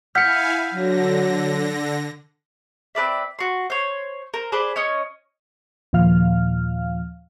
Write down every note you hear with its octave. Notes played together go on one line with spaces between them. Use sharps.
E4 F5 F#5 G#5 F6 G6 B6 C#7
D3 F#3 A#6
C4 B4 D5 E5
F#4 C6
C5 C#5
A#4 C5
G#4 B4 C5 D5
C#4 C#5 D#5
D#2 A#2 F3 F5 F6